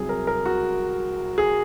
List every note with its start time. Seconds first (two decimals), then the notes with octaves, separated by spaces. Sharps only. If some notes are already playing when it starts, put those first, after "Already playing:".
Already playing: C2 C3 F#3 G#4
0.09 A#4
0.27 A#4
0.46 F#4
1.38 G#4